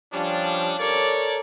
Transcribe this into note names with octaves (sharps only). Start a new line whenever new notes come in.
F3 G3 C#4 D4
A4 A#4 C#5 D5